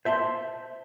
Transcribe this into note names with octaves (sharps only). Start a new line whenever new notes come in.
C5 E5 A5 B5 C6